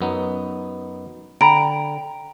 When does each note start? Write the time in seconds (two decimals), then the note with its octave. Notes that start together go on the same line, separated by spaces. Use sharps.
0.01 F#2 B3 D#4
1.41 D3 G5 A#5 B5 D7